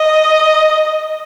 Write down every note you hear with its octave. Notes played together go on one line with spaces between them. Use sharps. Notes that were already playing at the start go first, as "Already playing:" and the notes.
Already playing: D#5